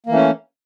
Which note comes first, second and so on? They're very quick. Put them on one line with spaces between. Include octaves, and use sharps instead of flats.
A#3 E3 A3 C#4